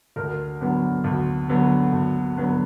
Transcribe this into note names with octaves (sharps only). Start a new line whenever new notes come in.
D2 A#4
D3 F#3 B3
D2
D3 F#3 B3
D2
D3 F#3 B3